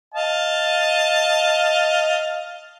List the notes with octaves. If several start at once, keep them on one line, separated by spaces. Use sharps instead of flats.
D#5 F5 A5